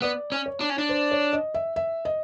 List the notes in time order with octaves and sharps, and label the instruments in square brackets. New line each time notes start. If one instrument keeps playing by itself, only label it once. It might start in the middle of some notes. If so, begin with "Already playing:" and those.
[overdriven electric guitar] B3 [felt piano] D5
[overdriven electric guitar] C#4
[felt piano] C#5
[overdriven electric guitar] D4
C#4
D4
[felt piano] C5
C#5
D#5
E5
E5
D#5